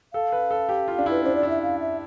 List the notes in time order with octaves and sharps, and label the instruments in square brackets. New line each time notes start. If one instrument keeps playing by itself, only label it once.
[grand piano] A4 [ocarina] F5
[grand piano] B4
A4
G4
F4
D4
[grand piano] E4 [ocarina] B4
[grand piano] D4 [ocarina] C5
[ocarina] D5
[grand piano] E4
[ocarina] E5
F5
E5